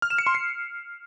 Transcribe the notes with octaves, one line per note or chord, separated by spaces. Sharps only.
F6
E7
C#7
C6
C7